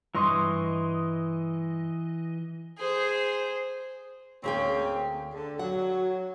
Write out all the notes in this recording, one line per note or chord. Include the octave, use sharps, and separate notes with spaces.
G2 E3 D#5 C6 C#6 A#6
G#4 C5
D2 A#3 C4 C#4 G#4 G5
D3
F#3 F#5